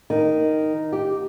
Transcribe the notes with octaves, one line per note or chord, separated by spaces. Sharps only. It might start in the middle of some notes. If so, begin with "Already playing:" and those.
D#3
G4